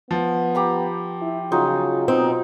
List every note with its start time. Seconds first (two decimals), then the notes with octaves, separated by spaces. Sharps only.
0.11 F3 B3
0.55 G4 A#5 B5
1.21 E4
1.52 C#3 F#3 D#4 F4
2.08 B2 C4 D#4